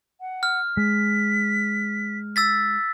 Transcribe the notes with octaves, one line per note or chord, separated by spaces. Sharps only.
F#5
F6
G#3 B6
E6 A6 B6